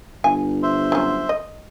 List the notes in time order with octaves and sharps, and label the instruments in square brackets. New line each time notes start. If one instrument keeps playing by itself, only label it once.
[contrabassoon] G1 [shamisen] G#5
[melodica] C5 E5 C6
[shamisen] F#3 C#4
D#5